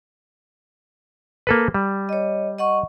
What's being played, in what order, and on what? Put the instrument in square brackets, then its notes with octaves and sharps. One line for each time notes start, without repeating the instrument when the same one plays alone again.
[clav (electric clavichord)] A#3 A4 B4
G3
[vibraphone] C#5 D#5
D#5 F#5 C#6